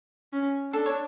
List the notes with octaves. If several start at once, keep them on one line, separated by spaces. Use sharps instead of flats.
C#4
D4 A4
C#5